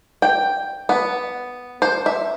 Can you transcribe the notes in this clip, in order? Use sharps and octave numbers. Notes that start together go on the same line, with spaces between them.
G5
B3
C5
E5